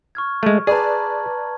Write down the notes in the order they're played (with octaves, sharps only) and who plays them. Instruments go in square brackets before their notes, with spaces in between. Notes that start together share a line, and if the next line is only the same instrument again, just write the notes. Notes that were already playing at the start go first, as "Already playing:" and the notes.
[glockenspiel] C#6 F6 G#6
[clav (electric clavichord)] G#3 A3
[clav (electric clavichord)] G#4 [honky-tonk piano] B4 D5 [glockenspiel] A5 A#5 G#6